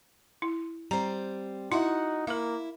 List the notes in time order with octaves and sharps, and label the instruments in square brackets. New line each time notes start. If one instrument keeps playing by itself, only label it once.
[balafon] E4
[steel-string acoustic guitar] G3 C4 C5 [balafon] A#5
[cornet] D#4 [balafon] E4 E5 [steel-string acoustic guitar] F#4 F#5
[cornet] A#3 [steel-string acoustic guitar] E4 [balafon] A#4 F5